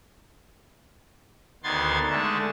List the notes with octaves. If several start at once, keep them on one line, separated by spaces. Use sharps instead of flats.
D2 D#3 B3 C6 G#6 A6
D3 G#3 A3 A5